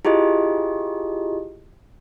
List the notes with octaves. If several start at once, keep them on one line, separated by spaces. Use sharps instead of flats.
E4 F4 G4 G#4 D#5